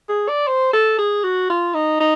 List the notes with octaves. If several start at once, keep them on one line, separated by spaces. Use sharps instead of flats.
G#4
D5
C5
A4
G#4
F#4
F4
D#4
D#4